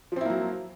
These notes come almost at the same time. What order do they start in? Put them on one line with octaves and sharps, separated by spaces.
F3 C4 E4 A#3 F#3